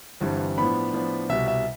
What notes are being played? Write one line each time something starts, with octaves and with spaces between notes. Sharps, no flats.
G1 G2 E3 G3 C4
A2 F3 B3 D4 B5
A2 F3 B3 D4
C2 B2 G3 E5
E5